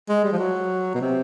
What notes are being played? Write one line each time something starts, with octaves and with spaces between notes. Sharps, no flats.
G#3
G3
F3
F#3
B2
C3